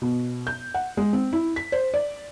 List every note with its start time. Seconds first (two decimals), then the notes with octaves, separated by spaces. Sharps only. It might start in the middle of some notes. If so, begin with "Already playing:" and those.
0.02 B2
0.47 G6
0.74 F#5
0.97 G#3
1.13 C4
1.33 E4
1.56 B6
1.72 C5
1.94 D5